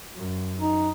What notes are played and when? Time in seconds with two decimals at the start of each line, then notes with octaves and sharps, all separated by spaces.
0.14 F#2
0.60 D#4